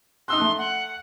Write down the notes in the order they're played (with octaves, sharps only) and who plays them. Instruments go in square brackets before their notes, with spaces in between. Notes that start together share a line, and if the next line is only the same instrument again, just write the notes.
[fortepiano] D#4 E6 F#6 [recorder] C6
[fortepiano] A3
[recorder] F#5